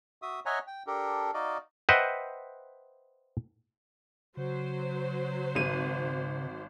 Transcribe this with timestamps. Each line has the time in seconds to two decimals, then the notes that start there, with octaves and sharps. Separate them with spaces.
0.22 F#4 E5 D#6
0.46 C#5 D#5 E5 F#5 G#5 A#5
0.67 G5
0.87 D4 G4 A4 A#4
1.34 D#4 F#4 D5 D#5 F5
1.89 B4 C5 D#5 E5 F#5 G5
4.37 C#3 F#3 C5
5.55 G#1 D#7